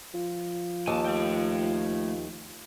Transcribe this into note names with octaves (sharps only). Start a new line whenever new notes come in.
F3
D#2 G#5 A5
A3 G5